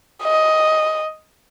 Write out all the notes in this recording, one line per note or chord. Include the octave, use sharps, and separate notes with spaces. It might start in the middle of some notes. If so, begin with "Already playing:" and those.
D#5